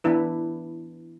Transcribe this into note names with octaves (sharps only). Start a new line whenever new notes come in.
E3 B3 D4 E4 B4